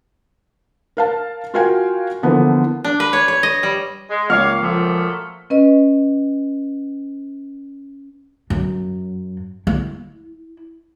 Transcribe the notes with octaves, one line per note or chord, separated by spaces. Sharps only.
A#4 F5 A5
F4 F#4 A#4 F5 G5 G#5
D3 E3 F3 A#3 B3
D4
B4
C#5
C#5
D#5
G3
G#3
C#2 A#3 C#5 F5 D6 F6
A#2 F3 F#3 A3
C#4 B4 D#5
F#2
E4